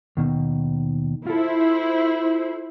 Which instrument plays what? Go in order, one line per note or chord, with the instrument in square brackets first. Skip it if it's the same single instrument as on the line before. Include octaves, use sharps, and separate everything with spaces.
[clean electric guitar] D#2 B2 D#3
[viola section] E4 C5 [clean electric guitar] F4 A4